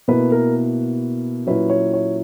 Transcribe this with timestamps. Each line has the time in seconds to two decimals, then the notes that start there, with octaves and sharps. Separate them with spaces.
0.08 B2 A#3 E4 B4
0.32 A#4
1.47 A#2 F#3 C#4 E4 B4
1.70 C#5
1.94 C#5